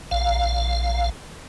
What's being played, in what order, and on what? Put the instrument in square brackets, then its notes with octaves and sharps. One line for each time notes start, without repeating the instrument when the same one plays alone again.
[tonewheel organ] A#1 F5